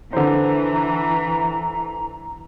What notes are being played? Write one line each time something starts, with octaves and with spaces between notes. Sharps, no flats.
D3 E3 C5 A#5